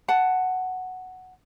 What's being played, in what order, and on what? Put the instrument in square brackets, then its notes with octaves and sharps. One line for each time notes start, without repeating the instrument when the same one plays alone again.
[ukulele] F#5 A5